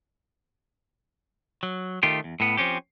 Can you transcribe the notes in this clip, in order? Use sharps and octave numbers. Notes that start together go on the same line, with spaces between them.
F#3
D#3 A3 F4 G4
E2
A2 B3
F3 C4 C#4 G4